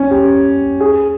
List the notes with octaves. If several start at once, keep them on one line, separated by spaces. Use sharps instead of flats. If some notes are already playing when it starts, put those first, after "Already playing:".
Already playing: C#4
G4
G#4